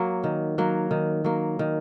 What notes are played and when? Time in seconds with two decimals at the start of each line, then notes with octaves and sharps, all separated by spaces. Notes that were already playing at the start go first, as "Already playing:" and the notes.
Already playing: F#3 A#3
0.24 D#3
0.58 F#3 A#3
0.91 D#3
1.24 F#3 A#3
1.59 D#3